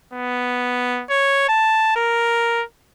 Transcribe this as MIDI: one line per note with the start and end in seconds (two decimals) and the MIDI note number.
0.14 1.03 59
1.10 1.44 73
1.49 1.92 81
1.96 2.63 70